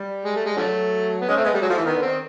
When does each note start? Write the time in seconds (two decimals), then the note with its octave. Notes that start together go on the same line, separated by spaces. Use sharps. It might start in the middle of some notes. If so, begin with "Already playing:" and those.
Already playing: G3
0.25 G#3
0.36 A3
0.46 G#3
0.57 D3 F3 F#3 A3
1.22 B3
1.29 G#3 C#4
1.37 A3 C4
1.45 G#3 B3
1.53 G3 A3
1.61 F#3 G#3
1.69 F3 A3
1.78 E3
1.85 D#3 B3
1.96 D3
2.02 D#3 C4